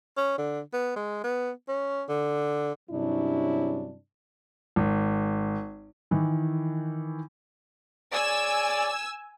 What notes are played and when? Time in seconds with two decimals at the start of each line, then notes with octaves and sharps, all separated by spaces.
0.17 C#4
0.38 D3
0.73 B3
0.96 G#3
1.24 B3
1.68 C#4
2.09 D3
2.90 G2 C3 F#3 C#4 D4 E4
4.76 G#1
6.11 D#3 E3 E4
8.13 G#4 C#5 D5 G#5 E6